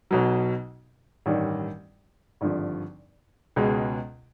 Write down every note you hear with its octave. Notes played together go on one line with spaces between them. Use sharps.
B1 B2 F#3
A1 G2 D#3 G3
G#1 G2 D3 F3
C#2 B2 G#3